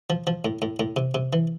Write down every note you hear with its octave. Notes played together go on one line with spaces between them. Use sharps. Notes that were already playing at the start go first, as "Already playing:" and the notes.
F3
F3
A2
A2
A2
C3
C3
E3